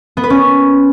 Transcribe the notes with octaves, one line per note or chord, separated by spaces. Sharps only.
B3
B4
C#4